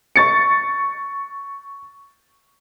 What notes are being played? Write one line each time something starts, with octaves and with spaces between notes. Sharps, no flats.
C#6 A6 C#7